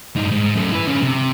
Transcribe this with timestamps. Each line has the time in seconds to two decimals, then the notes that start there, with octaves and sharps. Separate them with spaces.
0.16 G2 D#4
0.31 G#2
0.56 F#2 A3
0.72 E4 B4
0.86 D3 C#4
1.02 C3